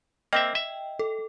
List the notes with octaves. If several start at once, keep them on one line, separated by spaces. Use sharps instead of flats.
A#3 C4 D#5 E5 G5
E5
A4